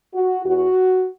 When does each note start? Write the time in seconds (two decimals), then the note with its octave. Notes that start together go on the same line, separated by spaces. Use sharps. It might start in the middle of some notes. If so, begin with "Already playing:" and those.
0.14 F#4
0.44 E2 E3 F#4